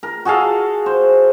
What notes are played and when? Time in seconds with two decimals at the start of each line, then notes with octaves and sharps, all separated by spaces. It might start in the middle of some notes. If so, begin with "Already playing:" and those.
0.03 A#4
0.25 F#4 G#4 A4 F5
0.86 C5